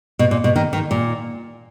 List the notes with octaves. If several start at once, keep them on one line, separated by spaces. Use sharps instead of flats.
B2
A#2
B2
D#3
D#3
A#2